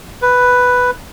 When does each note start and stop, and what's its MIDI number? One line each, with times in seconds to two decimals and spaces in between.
0.22 0.91 71